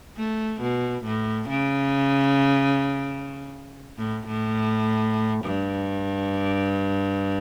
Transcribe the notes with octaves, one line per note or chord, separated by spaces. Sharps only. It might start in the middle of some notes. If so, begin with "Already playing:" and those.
A3
B2
A2
C#3
A2
A2
G2